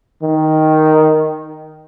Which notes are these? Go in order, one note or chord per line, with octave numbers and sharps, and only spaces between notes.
D#3